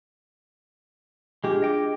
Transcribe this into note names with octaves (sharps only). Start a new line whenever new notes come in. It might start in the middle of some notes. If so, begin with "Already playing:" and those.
G#3 D4 F4 G4 G#4
D#5 G5 D6